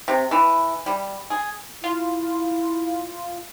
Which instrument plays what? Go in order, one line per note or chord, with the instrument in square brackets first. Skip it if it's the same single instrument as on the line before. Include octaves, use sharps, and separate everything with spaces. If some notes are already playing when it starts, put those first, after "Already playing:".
[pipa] C3
E3
G3
G#4
[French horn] E4 [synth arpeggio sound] F4